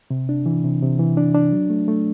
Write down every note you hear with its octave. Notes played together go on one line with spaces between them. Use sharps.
C3
D4
E3
C3
C3
E3
D4
D4
F#3
A3
A3